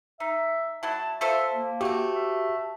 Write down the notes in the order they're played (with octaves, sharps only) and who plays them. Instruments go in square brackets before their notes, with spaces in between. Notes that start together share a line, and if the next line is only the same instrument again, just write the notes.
[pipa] D#4 [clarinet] E5
[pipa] F#3 E4 [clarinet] A5
[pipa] F4 A4 C5 [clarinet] E5
[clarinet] A#3
[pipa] A3 C4 [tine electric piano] F#4 G4
[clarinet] E5